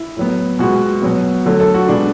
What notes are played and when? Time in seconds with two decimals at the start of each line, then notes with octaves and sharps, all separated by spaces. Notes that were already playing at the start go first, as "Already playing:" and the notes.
Already playing: E4
0.17 A2 F#3 B3
0.59 B2 G#3 B3 F#4
1.02 B2 F#3 B3
1.46 D3 F#3 A3
1.60 A4
1.74 F#4
1.88 B2 G#3 B3 D4